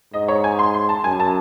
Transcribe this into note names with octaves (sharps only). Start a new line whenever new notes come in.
G#2 D#5
C#5
G#5
C6
C6
A5
F#2 G#5
A5